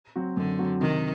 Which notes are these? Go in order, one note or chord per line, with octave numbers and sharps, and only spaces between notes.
F#3 C4 F#4
F#2 D3
F#3 C4 F#4
C3 D#3